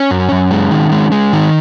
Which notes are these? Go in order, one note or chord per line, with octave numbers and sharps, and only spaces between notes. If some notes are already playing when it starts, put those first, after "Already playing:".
Already playing: C#4
F#2
F#2
G#3
D#3
G#3
G#3
D#3